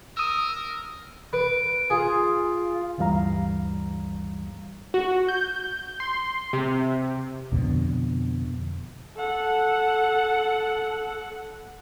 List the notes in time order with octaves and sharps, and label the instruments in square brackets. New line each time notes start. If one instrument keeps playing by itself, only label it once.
[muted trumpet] A#4 [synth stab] D#6 E6
[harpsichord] B4 [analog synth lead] D7
[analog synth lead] F4 [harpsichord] G#4
[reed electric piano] D2 G2 E3 G3 F5 A#5
[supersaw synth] F#4
G6
C6
C3
[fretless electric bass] F2 B2 D3
[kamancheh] A4 F#5